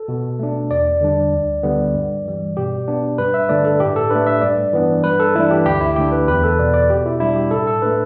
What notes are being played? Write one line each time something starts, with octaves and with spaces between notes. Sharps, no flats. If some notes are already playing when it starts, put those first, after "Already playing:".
Already playing: A4
B2
A3 D4
E2 D5
D3 G3 D4
D2
D3 G3 B3
G2
E3 G3
B2 G4
B3 D4
G2 B4
E5
D3 A3 D4 D5
A4
A2 G4
A4
A3 D4 B4
E5
G2 D5
E3 B3 D4
G2 B4
A4
E3 A3 D4 E4
G4
D2 G4
E4
D3 A3 D4 G4
B4
E2 B4
A4
B2 B3 D5
D5
B2 G4
E4
G3 D4 E4
G4
A2 A4
A4
A3 D4 B4